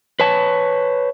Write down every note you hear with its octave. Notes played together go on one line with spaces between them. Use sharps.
B4 C#5 A5